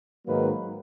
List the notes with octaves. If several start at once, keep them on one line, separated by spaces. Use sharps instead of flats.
G#2 D#3 F#3 A#3 B4